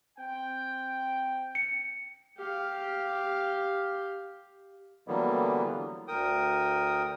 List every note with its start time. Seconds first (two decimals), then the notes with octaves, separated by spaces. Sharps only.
0.19 C4 G5
1.55 C#7
2.37 G4 F5
5.08 D3 E3 F#3 G3 A#3 B3
6.08 D2 A#4 G5 D#6